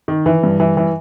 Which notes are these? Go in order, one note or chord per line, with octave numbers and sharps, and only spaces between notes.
D#3
E3
G2
E3
E3